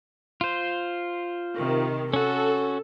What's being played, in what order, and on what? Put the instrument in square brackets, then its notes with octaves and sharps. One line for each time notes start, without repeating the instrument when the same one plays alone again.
[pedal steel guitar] F4 C5
[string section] C3 D#3
[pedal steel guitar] C#4 F#4 [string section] A4